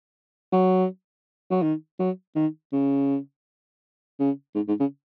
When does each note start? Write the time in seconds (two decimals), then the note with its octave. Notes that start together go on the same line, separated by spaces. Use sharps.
0.52 F#3
1.51 F#3
1.62 D#3
1.99 F#3
2.35 D#3
2.73 C#3
4.19 C#3
4.55 G#2
4.68 G#2
4.80 C#3